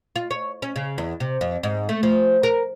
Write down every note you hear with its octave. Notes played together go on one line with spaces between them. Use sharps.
F4
C#5
C#4
C#3
E2
C3
F2
G#2
A3
F3
A#4